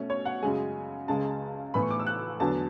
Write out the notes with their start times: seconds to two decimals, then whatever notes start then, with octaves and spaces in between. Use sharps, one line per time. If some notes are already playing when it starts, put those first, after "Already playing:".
Already playing: B2 A3 C#4
0.10 C#5
0.25 F#5
0.42 F#2 C#3 G#3 G#5
1.08 C#2 C#3 G#3 A5
1.74 A2 E3 B3 B5
1.82 C#6
1.91 D6
1.99 E6
2.07 F#6
2.40 E2 D3 F#3 B3 A5